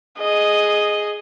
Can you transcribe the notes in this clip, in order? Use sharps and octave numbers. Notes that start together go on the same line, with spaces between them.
G#4 D#5